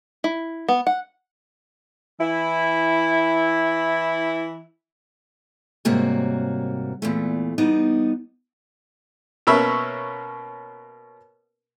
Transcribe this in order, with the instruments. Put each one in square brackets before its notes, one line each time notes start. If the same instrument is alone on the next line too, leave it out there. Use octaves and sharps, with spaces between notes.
[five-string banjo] E4
B3
F#5
[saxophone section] E3 E4
[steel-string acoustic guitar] G#2 C3 G3 A#3 F#4 C#5
E2 A#2 A3
G3 B3 D#4
[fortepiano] B2 A#3 C#4 E5 B5